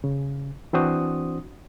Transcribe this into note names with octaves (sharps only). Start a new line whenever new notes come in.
C#3
E3 C4 D4 F#4 C5 D#6